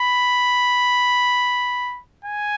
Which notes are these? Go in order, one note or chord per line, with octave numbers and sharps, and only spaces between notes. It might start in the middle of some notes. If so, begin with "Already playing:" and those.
Already playing: B5
G#5